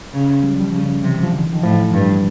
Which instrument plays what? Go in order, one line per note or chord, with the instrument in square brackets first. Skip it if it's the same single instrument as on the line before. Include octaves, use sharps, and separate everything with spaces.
[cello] C#3
[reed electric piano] G3
F#3
F3 G3
[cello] C#3
[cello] C3 [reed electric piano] E3 F#3
[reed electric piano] D#3 F3
D3 E3
D#3
D#3 F3
[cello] A2 [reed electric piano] D#3 F3
[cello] G2